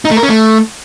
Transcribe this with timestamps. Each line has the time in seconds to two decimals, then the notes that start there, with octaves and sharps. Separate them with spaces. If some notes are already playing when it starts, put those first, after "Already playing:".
0.05 D#4
0.11 A3
0.17 A#4
0.23 C#4
0.29 A3